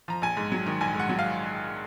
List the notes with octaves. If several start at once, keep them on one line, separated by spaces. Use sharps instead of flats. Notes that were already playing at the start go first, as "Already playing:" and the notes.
F3 A#5
A#1 G#5
G#2
F#3
D#3
A#1 G#5
G#2
F#5
F#3
F5